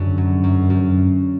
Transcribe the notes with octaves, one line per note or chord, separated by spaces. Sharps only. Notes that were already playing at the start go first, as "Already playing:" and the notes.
Already playing: F#2 D3
F#3
F#2
F#2